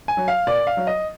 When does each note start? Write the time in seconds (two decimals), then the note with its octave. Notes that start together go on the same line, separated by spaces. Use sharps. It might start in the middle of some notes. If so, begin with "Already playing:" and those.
0.08 G#5
0.17 F#3
0.28 F5
0.47 A#2 D5
0.67 F5
0.77 F#3
0.87 D#5